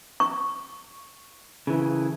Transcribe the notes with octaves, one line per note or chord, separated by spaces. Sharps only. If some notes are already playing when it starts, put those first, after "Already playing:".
C#6
C#3 E3